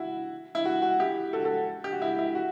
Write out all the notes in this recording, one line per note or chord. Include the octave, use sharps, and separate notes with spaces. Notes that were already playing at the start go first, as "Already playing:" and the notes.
Already playing: E4 F#4
E4
F#4
F#4
E4 G4
F#4 A4
F#4 A4
G4
F#4
E4
E4
F#4